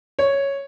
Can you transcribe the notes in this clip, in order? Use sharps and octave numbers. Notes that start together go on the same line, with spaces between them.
C#5